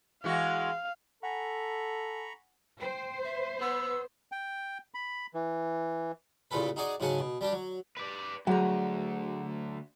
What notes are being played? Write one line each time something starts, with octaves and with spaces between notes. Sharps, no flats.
E3 G#3 F#4 F5
A4 F#5 G#5 A#5 B5 C#6
C5 G5
E5
B3 E6
G5
B5
E3
A1 A#2 C#3 C4 A4 B4
D#4 F#4 G#4 D5 D#5
G#2 C#3 F#3 F#5 G#5 A5
B2
G3 D4 G4
F#3
B4 D5
D2 F#3 F#4 G#4 F#5 A#5